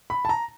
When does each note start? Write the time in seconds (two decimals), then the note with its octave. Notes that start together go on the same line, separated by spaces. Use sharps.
0.10 B5
0.25 A5
0.29 A#5